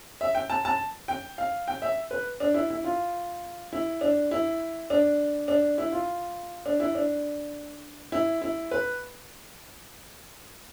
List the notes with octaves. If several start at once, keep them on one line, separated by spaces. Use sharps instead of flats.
E5
G5
A5
A5
G5
F5
G5
E5
B4
D4
E4
E4
F4
E4
D4
E4
D4
D4
E4
F4
D4
E4
D4
E4
E4
B4